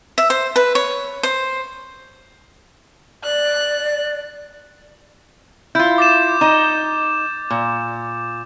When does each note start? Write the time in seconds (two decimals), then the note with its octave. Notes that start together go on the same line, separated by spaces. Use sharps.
0.18 E5
0.30 C5
0.56 B4
0.75 C#5
1.23 C5
3.24 D5 F#6
5.75 E4 F4 G6
5.98 D6 A6 E7
6.41 D#4 D#5
7.50 A#2